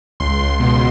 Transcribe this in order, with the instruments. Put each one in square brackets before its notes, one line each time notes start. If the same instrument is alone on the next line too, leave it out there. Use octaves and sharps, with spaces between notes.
[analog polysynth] C#2 C6
C#2
B2